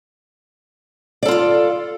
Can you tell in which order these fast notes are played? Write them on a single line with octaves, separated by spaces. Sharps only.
D5 A4 F4 F5